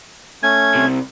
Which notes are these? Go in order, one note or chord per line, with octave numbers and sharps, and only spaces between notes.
A3 C#4 G#6
C2 C3